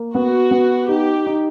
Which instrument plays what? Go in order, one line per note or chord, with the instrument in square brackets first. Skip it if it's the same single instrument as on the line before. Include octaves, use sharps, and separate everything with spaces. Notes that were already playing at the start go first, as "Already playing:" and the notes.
Already playing: [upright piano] A#3
[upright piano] B3 [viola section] F#4
[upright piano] B3
[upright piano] D#4 [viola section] G4
[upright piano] D#4